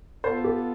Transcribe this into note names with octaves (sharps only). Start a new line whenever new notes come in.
B3 F4 A4 C5
G4